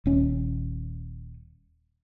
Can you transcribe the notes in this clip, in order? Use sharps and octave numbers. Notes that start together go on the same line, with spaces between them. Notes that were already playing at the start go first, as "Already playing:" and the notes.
D#1 C#4